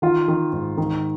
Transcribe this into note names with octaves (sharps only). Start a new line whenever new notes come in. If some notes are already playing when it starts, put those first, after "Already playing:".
D#3 F4
D#3
G#2
D#3